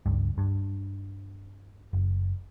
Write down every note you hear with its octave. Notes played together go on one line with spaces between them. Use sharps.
G1 C#2 G2
G2
F#1